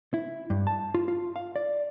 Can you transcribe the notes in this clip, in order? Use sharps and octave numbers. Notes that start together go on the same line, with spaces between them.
E4
G2
A5
F4
F4
F5
D5